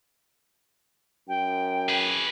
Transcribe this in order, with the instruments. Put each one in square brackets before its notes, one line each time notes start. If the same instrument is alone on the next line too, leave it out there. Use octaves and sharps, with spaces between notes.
[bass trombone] F#2 [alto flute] G5
[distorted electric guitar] G#4 B4